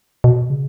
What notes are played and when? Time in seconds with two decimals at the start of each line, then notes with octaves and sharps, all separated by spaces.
0.24 B2
0.50 C#3